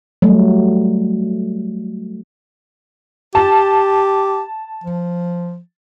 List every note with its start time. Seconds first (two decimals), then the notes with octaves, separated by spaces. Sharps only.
0.22 F#3 G3 A3
3.35 G4 A5
4.84 F3